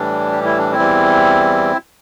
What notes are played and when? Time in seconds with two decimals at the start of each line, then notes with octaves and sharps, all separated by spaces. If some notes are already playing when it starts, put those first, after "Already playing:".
Already playing: A2 E3 G3 D4
0.32 G4
0.45 E4
0.58 D4
0.72 C4 E4
0.79 E2 E3 G3